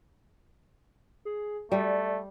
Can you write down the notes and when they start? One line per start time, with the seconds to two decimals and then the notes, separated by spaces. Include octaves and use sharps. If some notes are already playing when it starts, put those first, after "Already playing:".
1.25 G#4
1.72 G3 A3 D5